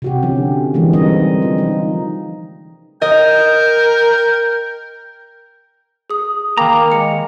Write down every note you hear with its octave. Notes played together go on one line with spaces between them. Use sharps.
C3 F#4 G4
D3 F3 C#4
D3 E3 G#3 A#3
G3 G#3 C4 D#4 D#5
F3
D#4
A#4 D#5 G5
G#4 D#6
D#3 A#3 G5 A#5 B5 D6
G#3 C#7